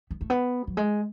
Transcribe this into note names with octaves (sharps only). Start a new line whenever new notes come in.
B3
A3
B3
F#3
G#3